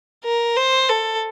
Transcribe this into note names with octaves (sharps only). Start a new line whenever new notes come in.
A#4
C5
A4